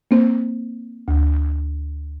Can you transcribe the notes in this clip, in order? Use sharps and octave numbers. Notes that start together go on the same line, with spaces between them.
A#3 C4 C5
D2